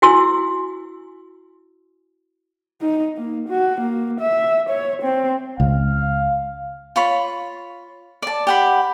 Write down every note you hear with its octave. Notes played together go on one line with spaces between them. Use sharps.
E4 F#4 G#5 C6 D6 E6
D#4
A#3
F#4
A#3
E5
C#5
C4
C#2 F5
F4 C#5 B5
D5 A5
G4 F#5 B5